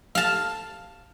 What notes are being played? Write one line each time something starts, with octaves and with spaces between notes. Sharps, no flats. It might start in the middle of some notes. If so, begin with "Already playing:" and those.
F5 A5